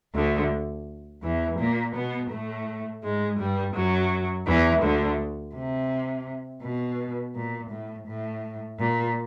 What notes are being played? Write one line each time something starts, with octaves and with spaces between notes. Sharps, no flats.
D2 D3
E2 E3
A#2 A#3
B2 B3
A2 A3
G#2 G#3
G2 G3
F#2 F#3
E2 E3
D2 D3
C3
B2
A#2
A2
A2
A#2